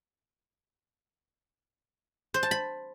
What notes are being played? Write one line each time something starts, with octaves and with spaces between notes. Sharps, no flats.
C5
A5
B5